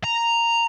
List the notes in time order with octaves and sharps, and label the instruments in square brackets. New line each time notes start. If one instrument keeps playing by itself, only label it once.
[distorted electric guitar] A#5